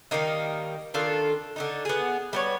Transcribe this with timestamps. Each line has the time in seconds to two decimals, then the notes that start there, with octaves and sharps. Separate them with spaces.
0.11 D#3 G3 A#3 D#4
0.94 D#3 D4 F4 A4
1.56 D3 D4 D#4
1.85 B3 G#4
2.33 G3 B3 C#5